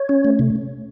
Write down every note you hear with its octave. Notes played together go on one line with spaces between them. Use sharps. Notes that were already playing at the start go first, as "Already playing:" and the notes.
Already playing: C#5
C#4
A3
C3